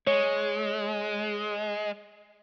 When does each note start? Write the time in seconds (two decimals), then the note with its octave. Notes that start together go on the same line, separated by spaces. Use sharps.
0.07 G#3 C#5